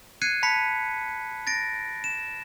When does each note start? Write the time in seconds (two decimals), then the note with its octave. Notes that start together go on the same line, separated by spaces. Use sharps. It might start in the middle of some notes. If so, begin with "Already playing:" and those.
0.22 F#6 G#6 C7 C#7 D#7
0.43 A5 B5 B6 C#7
1.47 A6 A#6 D7
2.04 E7